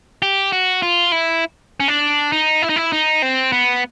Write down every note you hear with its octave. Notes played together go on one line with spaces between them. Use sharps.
G4
F#4
F4
E4
C#4
D4
D#4
E4
D#4
E4
D#4
C4
B3